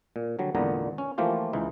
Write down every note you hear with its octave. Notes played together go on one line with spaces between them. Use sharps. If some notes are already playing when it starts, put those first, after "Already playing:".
A#2
D3 F#3 G3
G#1 E2 A#2 D3 B3 A#5
C#4
E3 F3 A3 A#3 F4 G4
C#2 E3 D#4